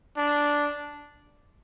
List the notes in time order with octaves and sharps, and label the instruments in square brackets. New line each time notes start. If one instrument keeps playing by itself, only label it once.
[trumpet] D4